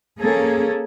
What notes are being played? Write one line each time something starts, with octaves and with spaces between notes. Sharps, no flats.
A#3 C#4 G#4 A4